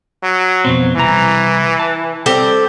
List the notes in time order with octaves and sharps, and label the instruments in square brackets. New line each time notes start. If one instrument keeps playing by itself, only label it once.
[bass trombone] F#3
[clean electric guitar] F2 B2 C4
[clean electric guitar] C2 A#5 [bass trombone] E3
[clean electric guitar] A5
[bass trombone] G3 [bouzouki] C4 G4 A4